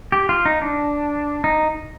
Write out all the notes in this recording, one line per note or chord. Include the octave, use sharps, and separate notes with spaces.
G4
F4
D#4
D4
D#4